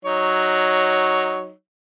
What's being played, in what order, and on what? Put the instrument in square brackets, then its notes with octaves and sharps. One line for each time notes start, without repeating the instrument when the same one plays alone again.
[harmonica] F#3 D#4 C#5